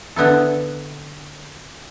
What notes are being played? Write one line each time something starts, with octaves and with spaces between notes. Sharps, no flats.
D3 B3 E4 A4